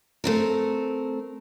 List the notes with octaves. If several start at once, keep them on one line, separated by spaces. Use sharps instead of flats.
A3 C4 A#4